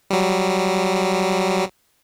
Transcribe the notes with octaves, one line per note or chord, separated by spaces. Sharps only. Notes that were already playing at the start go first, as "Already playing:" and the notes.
F#3 G3